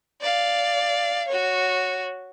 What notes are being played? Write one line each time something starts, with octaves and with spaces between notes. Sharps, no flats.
D5 F5
F#4 C#5